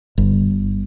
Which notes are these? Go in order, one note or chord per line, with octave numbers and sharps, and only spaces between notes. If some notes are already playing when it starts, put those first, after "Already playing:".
G1